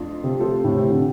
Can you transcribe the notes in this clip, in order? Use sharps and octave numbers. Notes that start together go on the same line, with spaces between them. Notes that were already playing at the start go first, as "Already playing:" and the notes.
Already playing: F2 F3 A3 D4 F4
C3
F3 A3 F4 A4 C5
A2
C3
D3